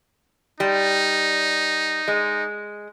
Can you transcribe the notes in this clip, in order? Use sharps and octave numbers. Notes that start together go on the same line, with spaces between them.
G3 D#4
G#3